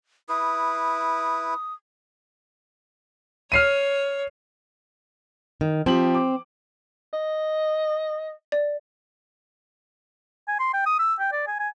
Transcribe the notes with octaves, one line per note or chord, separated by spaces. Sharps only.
E4 B4 D#6
C#5 F6 C7 D#7
D#3
F3 C4 G4 F#7
D6
D#5
D5
G#5
C6
G5
D#6
E6
G5
D5
G#5
G#5